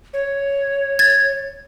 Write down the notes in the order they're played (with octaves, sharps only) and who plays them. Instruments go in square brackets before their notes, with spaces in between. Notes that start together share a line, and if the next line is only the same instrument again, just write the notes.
[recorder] C#5
[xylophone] G#6 A6